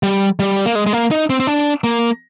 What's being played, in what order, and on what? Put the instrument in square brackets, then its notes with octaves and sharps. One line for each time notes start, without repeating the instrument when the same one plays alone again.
[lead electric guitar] G3
G3
A#3
G#3
G#3
A#3
D#4
C4
C4
D4
A#3